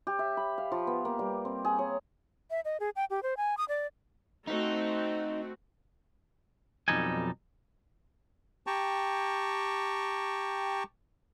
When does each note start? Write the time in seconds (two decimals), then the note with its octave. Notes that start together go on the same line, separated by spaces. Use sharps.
0.07 G4
0.19 E5
0.37 B5
0.58 F5
0.72 F3
0.87 B3
1.05 A#3
1.19 G3
1.45 C4
1.65 G#4
1.79 C#5
2.50 E5
2.65 D#5
2.80 G#4
2.96 G5
3.10 G4
3.23 C5
3.37 G#5
3.58 D#6
3.69 D5
4.47 A3 C4 D#4 F#4
6.88 B1 F2 G3 D#4 A4 G#5
8.67 G4 G5 A5 A#5 C#6